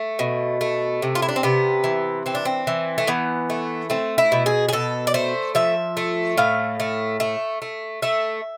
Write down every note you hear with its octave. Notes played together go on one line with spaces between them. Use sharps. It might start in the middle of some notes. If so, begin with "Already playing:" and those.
Already playing: A3
B2
A3
C3
F4
E4
D4
C4
C3 B3
E3
E3 C4
D4
C4
E3
A3
E3 B3
A3
A3 C4
E4
B2
G#4
G#4
B2 A4
D5
A3 C5
F3 E5
A3
A2 F5
A3
A3
A3
A3 E5